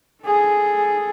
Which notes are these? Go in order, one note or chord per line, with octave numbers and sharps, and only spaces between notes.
G#4 A4